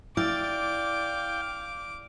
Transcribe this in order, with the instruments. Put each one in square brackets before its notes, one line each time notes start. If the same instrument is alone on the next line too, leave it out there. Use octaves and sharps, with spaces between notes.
[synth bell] E4 [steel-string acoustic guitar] D5 [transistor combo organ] F5 G5 [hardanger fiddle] D6